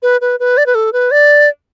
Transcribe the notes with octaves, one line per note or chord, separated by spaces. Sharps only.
B4
B4
B4
D5
B4
A4
B4
D5